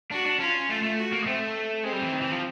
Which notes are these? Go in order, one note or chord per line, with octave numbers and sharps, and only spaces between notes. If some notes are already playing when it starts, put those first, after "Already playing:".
D4 F#4
D4
C#4 F4
A3 F4
A3
F#4
A#3
G#3
A3 C4
G#3 C4
G3
E3
D#3
E3
F3